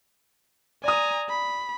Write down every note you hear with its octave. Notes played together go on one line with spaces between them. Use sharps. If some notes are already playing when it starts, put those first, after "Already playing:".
D5 G#5 A#5 D#6
B5